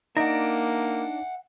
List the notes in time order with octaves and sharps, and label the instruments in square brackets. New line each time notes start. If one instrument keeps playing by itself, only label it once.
[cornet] A#3 [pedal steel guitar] D4 D5 A#5 [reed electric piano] D#4 [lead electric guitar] E5 F#5